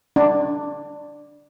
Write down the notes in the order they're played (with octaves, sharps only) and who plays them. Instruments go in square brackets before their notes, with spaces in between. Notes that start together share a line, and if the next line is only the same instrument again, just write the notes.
[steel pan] D4